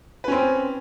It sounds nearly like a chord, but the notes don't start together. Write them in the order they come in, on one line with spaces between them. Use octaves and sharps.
B4 C#4 C4